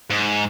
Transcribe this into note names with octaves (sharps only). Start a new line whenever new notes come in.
G#2